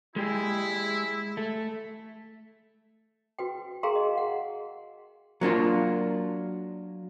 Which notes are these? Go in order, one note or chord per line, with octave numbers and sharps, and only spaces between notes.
G#3 E4 G4 G#4
A3
F#4 B4 G5
G#4 A#4 F5 G5 A#5 C6
D#5
F#5
F#3 A#3 D4 F4